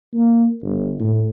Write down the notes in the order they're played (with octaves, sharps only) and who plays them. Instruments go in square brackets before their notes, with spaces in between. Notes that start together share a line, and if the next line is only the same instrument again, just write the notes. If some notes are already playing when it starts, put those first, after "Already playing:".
[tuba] A#3
G1
A2